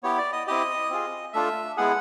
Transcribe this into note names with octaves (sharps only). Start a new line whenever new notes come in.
B3 E4 G4 C#5
D5
D#5
C4 E4 G4 D#5
C4 F4 G#4
A3 D4 F4 E5
G#3 B3 E4 G#4 F#5